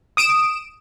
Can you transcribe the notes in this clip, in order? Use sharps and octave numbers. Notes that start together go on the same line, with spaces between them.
D#6 D7 E7